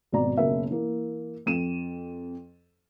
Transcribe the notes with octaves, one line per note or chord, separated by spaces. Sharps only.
G#1 B2 D5 A#5
F#1 B2 A#4 E5
E3 A#3
F2 D#7 E7